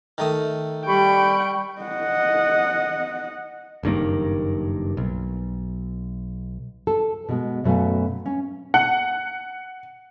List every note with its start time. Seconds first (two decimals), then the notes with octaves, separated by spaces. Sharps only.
0.18 D#3 A3 D#6
0.87 G3 G5 B5 C#6
1.81 D#5 F#5
3.83 F#1 G2 D#3 A#3
4.97 B1
6.87 A4
7.29 B2 G#3
7.64 F#2 B2 A3 F5 G#5
8.26 C#4
8.74 F#5